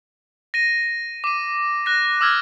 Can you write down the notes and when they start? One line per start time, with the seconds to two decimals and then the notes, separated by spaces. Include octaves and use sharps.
0.54 A#6 D#7
1.24 D6 D#7
1.86 F#6 A#6
2.21 D6 E6 F6 G#6